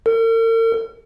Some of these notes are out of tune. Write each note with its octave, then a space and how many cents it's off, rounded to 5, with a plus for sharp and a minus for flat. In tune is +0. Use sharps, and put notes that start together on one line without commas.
A#4 -45